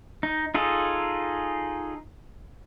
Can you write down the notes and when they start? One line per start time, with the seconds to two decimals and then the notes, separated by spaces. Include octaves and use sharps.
0.23 D#4
0.54 D#4 F4 G#4 A4